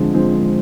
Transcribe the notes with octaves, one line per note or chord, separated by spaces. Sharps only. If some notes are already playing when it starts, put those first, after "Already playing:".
Already playing: D3 F3 G#3 C4
D3 F3 G#3 C4